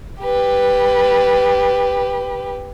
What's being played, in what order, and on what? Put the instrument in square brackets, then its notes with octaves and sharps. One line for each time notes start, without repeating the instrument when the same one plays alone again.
[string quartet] G4 B4